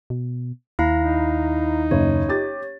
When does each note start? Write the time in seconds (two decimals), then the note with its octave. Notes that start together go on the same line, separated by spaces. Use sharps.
0.10 B2
0.79 D#2 E4 F5 A#5
1.00 D#4
1.91 F#1 C#5
2.29 G4 A6